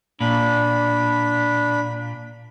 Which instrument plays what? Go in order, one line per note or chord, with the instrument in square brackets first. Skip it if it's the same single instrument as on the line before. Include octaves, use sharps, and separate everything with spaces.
[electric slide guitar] A#2 [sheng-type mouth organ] D4 B5